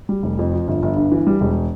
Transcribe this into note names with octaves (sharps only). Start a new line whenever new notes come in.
G3
F1
F2
F3
G1
G1
G2
E3
G3
E1